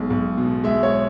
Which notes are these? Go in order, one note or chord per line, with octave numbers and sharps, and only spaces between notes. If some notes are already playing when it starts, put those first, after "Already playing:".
Already playing: B1 G#3
B1
B2
G#3 E5
C#5